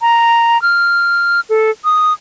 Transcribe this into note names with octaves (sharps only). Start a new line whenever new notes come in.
A#5
F6
A4
D#6